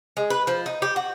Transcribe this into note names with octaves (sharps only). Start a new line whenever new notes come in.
G#3
B4
F3
D#4
G4
F#4